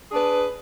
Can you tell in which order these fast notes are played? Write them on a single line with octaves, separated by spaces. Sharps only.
G#4 D4 B4